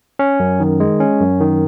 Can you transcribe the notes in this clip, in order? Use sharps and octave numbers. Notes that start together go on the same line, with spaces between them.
C#4
F#2
D#3
G#3
C#4
F#2
D#3